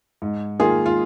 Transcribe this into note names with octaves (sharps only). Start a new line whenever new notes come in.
G#2
D#3 A#3 F4 G#4
F4